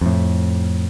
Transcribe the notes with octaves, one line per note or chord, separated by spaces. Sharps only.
F2 A2